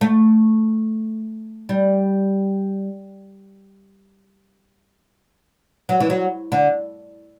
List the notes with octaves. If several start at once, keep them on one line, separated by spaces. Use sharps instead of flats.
A3
G3
F#3
E3
F#3
D3